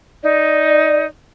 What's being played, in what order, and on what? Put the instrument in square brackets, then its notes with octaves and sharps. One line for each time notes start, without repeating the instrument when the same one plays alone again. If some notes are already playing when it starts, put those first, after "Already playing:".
[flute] D#4 [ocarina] D5